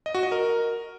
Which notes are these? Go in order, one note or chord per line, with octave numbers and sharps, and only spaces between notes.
D#5
F#4
D#5
A#4